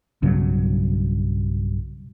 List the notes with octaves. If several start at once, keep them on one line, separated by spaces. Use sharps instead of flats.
B1 G2 C#3 F#3